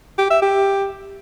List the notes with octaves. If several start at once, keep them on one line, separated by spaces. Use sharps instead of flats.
G4
E5
G4